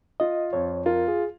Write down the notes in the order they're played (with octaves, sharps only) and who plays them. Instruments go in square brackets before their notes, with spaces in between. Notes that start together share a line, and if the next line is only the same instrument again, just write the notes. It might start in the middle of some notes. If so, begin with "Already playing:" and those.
[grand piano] F4 [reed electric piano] D#5
[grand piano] F2 [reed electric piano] C#5
[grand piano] F4 [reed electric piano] A#4
[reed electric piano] G#4